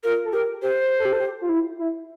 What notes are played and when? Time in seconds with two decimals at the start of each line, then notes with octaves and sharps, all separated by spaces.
0.04 F4 A#4
0.25 A4
0.33 G4 A#4
0.62 G4 C5
0.99 A4
1.05 G4
1.13 A4
1.20 G4
1.41 F4
1.49 E4
1.79 E4